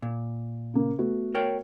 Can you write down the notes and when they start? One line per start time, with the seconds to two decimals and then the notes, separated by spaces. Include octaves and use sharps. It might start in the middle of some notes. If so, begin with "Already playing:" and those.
0.02 A#2
0.74 C#3 A#3
0.98 A3 B3 F#4
1.35 A#4 C#5 G5